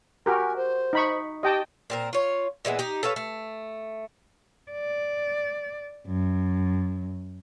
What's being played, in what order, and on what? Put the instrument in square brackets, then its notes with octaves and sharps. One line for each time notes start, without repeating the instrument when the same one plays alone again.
[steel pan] F#4 G4 A#4 [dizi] G#5
[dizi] C5
[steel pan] D#4 B5 C#6
[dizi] G4 [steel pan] D#5 G5 A5
[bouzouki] A#2 C4 A#4
F4 C#5
A#2 E3 G#3 B3
D#4 G4
A4 B4 C#5 F5
A3
[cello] D5
F#2